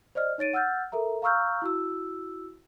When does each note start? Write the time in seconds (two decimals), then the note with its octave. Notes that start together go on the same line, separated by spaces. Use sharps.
0.15 C5 D5 D#5 F6
0.38 D#4 C#5 A6 D7 D#7
0.53 F#5 E6 F6 G6 A6
0.92 A4 A#4 E5 A#5
1.22 F5 A#5 C#6 E6 F6 G6
1.62 E4 F#4 E6